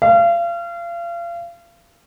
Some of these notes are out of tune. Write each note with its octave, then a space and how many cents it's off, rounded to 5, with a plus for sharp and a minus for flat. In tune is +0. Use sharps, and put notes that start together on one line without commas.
F5 -35